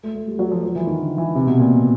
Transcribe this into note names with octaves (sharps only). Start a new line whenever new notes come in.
A3
A3
G3
F#3
F3
F3
E3
D#3
D3
E3
C3
B2
A#2